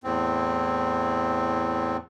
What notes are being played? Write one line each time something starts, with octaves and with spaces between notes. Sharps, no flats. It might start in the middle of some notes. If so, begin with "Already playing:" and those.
E2 A2 C4